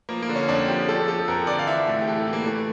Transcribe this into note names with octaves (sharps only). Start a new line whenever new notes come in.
F3 A#3
A#3
D3
C#4
F2 D4
F3 G4
F3 A4
F3 A4
F2 A#4
D3 D5
F5
E3 E5
A2
G4
E3 A4
G4
E3
A#3
E3 A3